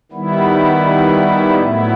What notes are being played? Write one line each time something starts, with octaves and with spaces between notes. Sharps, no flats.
D#3 G3 B3 E4
A2 F#3 B3 E4